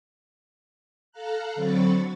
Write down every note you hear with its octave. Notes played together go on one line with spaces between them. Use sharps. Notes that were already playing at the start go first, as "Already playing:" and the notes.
A4 F5 A#5 F#6
D3 F#3 C4 B5 C#6 A6